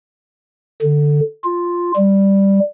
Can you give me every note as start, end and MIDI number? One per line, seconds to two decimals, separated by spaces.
0.82 1.20 50
1.44 1.92 65
1.96 2.60 55